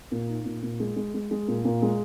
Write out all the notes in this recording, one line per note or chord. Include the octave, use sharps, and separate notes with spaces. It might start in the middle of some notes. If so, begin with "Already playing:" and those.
A#2
D#4
A#2
A#2
G#3
G#3
G#3
G#3
A#2
A#2
G#3